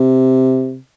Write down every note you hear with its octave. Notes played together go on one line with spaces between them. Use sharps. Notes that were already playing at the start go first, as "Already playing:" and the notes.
Already playing: C3